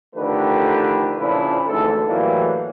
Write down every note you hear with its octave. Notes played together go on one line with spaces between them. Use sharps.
D3 D#3 F3 A3 G4 B4
A#2 C#3 F3 D4 E4
G#1 D2 G#2 E3 A4
A2 E3 F#3 G3 A#3